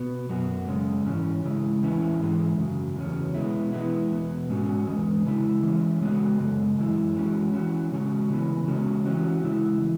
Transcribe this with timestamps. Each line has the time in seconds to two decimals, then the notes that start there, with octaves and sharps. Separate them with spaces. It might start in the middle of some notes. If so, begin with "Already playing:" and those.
Already playing: B2 B3 F#4
0.29 F#2 F#3 B3 F#4
0.68 F#2 C#3 G#3 C#4
1.06 G#2 E3 C#4
1.44 C#3 G#3 E4
1.83 E2 E3 C#4 E4
2.20 G#2 E3 G#3
2.58 F#2 C#3 F#3
2.96 E2 C#3 F#3 C#4
3.34 B2 G#3 B3 E4
3.73 E3 G#3 B3 E4
4.11 E2 B2 B3
4.49 G#2 G#3 C#4 F#4
4.87 E2 C#3 E3 G#3
5.25 C#3 G#3 E4
5.63 E3 G#3 C#4
6.01 C#3 G#3 B3 F#4
6.39 F#2 C#3 G#3
6.78 F#2 E3 G#3 E4
7.16 E3 G#3 C#4 F#4
7.53 E3 C#4 F#4
7.92 C#3 G#3 C#4 F#4
8.30 C#3 E3 B3 E4
8.68 C#3 G#3 C#4 F#4
9.05 E3 C#4 F#4
9.44 C#3 G#3 E4
9.81 E3